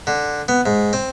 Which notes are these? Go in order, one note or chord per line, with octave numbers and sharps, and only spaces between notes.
D3
B3
G#2
C4